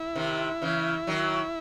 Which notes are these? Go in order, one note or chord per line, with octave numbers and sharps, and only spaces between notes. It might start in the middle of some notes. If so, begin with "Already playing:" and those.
Already playing: E4
C3 D#3
C#3 E3
D#3 F#3